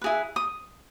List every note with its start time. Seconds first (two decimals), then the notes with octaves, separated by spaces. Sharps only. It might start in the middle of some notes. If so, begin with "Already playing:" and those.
0.01 E4 G#4 B4
0.36 D#6